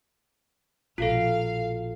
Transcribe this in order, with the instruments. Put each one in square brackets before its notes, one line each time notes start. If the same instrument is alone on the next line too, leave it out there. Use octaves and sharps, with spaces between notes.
[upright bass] A#1 B2 [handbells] F4 F#4 A4 [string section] F5